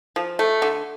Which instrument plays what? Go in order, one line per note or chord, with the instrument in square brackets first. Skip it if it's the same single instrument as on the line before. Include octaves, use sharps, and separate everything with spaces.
[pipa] F3
A3
D3